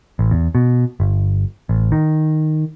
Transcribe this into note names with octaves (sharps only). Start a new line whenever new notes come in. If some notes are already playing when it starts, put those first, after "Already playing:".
A1
E2
B2
G1
A1
D#3